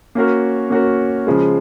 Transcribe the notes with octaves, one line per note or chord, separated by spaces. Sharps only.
A#3 C#4 F#4 A#4
A#3 C#4 F#4 A#4
C#3 F3 G#3